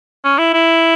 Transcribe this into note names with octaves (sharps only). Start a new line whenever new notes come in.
C#4
E4
E4